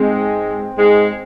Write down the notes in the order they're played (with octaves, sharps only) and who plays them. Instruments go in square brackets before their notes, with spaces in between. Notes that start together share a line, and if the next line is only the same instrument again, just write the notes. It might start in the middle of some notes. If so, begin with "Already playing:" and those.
Already playing: [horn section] G#2 G#3 [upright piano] C4
[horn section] G#2 G#3